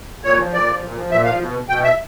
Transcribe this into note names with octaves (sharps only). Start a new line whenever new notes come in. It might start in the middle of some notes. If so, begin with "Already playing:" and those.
A#2 C#5
F3
A#2 D5
F3
A#2
F3
A#2 E5
F3 F5
B2
B2 G5
E5